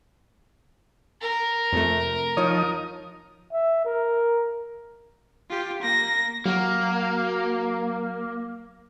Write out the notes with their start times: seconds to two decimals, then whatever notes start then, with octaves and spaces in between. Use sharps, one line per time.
1.22 A#4
1.72 F2 C3 A3
2.37 F3 D#4 C#5 D#6
3.52 E5
3.85 A#4
5.50 F4 G4
5.82 A#3 A#6
6.46 F#3 A#3 F#4